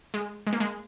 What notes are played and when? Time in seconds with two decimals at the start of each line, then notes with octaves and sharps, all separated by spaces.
0.14 G#3
0.47 G#3
0.53 A#3
0.60 G#3